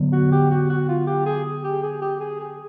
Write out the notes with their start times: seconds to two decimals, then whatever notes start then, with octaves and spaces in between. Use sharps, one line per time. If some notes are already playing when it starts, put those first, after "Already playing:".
Already playing: D3 F#3 B3
0.13 F#4
0.32 G4
0.51 F#4
0.70 F#4
0.88 F4
1.07 G4
1.26 G#4
1.64 G4
1.83 G#4
2.02 G4
2.21 G#4
2.40 G#4